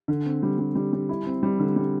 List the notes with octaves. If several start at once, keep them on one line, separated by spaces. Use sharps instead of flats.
D3
C4
G3
G3
G3
G3
E4
C4
G3
D3
G3